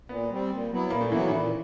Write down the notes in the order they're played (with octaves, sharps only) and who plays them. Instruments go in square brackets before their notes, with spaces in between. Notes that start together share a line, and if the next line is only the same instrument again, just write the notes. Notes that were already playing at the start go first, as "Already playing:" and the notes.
[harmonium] A#2 [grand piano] B3
[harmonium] G3 C4
A#2
F#3 B3 E4
[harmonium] A#2 [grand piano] A#3
[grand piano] A3
[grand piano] E3 [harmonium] F#3 B3 E4
[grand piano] D#3
[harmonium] A#2 [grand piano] E3